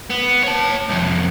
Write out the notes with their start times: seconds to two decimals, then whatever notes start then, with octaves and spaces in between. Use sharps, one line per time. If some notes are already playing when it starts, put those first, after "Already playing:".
0.10 B3
0.44 C#5 A5
0.89 C2 F2